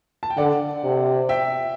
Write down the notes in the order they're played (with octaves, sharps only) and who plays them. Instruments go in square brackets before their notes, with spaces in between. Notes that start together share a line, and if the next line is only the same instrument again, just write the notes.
[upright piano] A5
G5
[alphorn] D3 [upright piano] D5 F#5
[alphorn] C3
[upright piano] E5 G5